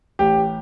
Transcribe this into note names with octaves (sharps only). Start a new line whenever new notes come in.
A1 G4